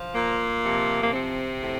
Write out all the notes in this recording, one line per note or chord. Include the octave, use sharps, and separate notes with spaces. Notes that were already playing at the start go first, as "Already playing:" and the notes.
Already playing: F3
A#2 A#3
C3 F3
A#3
C3 C4
A2